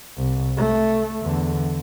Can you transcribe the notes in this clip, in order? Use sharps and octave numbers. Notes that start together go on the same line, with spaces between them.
C2
A3
E2 D3